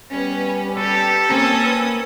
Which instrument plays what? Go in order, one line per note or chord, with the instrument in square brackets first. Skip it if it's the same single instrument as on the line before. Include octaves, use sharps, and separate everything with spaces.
[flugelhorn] G3 [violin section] B3 C#4 B4
[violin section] G4 [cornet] A4 [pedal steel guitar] B4
[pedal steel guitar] A#3 A#5 [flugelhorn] C4 [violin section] C#4 D#6
[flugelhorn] B4